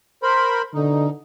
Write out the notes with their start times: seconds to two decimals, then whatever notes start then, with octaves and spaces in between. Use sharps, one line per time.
0.23 A#4 C5 B5
0.74 B2 D3 D#4